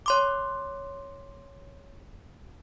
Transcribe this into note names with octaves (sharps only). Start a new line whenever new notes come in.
C#5 C6 D6